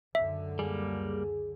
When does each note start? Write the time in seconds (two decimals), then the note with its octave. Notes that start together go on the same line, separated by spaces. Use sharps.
0.15 C#2 F#2 D3 E5
0.59 G3 A#3 G#4